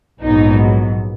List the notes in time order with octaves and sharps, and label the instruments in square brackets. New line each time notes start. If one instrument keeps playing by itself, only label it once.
[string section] A#1 G#2 F#3 B3 D#4